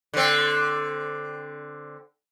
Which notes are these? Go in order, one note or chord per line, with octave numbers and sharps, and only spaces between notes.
D3 C4